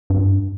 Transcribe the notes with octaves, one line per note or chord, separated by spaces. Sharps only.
G2